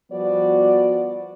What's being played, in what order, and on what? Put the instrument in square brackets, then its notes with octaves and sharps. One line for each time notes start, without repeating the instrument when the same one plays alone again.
[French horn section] F3 G3 B3 F#4 D5